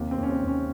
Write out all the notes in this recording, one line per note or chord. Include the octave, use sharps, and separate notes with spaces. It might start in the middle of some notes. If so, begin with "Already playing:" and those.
Already playing: D#2 C3
C4
D#2
C#4
C4
D#2
C#4